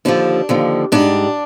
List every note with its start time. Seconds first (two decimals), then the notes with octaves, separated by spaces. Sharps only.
0.05 D#2 D3 F3 D4
0.49 D#2 D3 F3
0.92 G#2 G3 D4